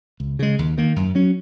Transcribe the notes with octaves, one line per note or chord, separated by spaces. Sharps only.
C#2
C#3 G#3
D#2
D#3 A#3
F#2
F#3 C#4